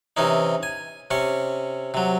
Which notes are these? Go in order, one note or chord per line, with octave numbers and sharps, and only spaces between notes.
C3 E3 C#4 D#4
G#5
C3 C#4 C#6
C3 F#3